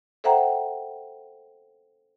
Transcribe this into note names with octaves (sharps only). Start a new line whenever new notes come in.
A4 C5 E5 F#5 G5 A#5